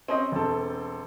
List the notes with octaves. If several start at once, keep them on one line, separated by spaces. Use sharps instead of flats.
C4 C#4 D#5
E1 C4 A4